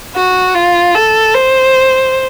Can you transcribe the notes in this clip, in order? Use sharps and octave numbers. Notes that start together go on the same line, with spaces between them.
F#4
F4
A4
C5